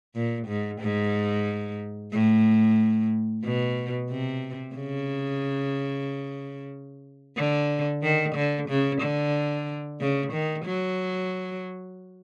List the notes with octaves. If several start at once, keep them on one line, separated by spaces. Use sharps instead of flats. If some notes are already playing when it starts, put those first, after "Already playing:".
A#2
G#2
G#2
A2
B2
C3
C#3
D3
D#3
D3
C#3
D3
C#3
D#3
F#3